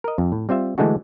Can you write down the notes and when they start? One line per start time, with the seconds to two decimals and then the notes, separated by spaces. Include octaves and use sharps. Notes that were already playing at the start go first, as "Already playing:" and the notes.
0.04 A#4 D#5
0.18 F2
0.32 A2
0.49 G3 C4 F4 E5
0.78 D3 E3 G#3 A3 D4 F#4